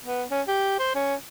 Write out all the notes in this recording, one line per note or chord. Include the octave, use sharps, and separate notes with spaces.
B3
C#4
G4
C5
C#4